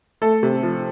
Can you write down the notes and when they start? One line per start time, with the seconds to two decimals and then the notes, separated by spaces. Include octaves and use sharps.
0.22 A3 A4
0.43 C3
0.63 F3